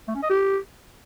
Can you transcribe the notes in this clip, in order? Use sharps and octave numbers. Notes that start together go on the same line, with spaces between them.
A3
C#4
D#5
G4